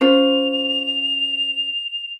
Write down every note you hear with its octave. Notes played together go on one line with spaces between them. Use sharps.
C#4 F4 C5 F7